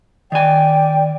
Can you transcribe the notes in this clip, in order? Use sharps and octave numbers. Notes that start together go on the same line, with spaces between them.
D#3 D5 G5 G#5